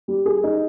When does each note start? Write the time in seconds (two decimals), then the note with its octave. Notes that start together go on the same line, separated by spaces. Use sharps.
0.08 G3
0.26 G#4
0.43 D#4